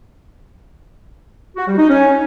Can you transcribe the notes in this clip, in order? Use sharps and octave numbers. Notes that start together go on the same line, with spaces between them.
F#4
G3
D#4
C#4